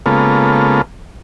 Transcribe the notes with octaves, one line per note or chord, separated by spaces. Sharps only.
C#3 G#3 A#3 B3 F4 A4